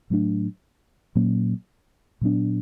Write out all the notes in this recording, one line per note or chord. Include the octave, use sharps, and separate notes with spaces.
A2 F#3 A3 D4
A#2 F#3 A#3 C#4
A#2 F#3 B3 D4